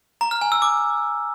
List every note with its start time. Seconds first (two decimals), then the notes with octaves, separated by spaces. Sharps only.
0.21 A#5
0.31 F6
0.41 G#5
0.52 E6
0.62 D6